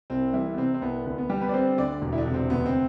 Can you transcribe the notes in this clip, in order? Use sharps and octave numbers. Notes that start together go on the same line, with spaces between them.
C2 C4
E3 G3 E4
B3
C3 C4
C4
C2 B3
D2 B3
B3
G3 G4
B3 B4
D5
D3 C4 C5
D2 D4 D5
E1
E4
D3 D4
C3
C4
D2 B3
C4